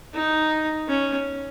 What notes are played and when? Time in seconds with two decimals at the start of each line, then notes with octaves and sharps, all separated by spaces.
0.14 D#4
0.88 C#4